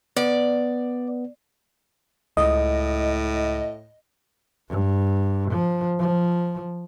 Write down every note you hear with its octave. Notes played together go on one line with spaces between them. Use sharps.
B3 D5
C#2 A2 D#5
G2
F3
F3